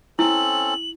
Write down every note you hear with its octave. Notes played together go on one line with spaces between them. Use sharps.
C4 C#4 E4 A4 F#7